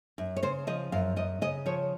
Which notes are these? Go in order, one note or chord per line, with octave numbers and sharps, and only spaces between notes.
F#2
C#5
C#3 C5
F3 D#5
F#2 F5
F#2 D#5
C#3 D#5
F3 C#5